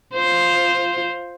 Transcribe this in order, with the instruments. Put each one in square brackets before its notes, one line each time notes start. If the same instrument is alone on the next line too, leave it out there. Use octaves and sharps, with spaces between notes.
[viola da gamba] F4 C5